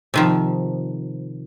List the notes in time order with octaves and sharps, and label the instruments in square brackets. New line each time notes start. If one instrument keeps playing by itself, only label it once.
[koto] C3 D#3 F3